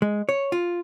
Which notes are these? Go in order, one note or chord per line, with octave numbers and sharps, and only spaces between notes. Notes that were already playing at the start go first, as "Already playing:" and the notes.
G#3
C#5
F4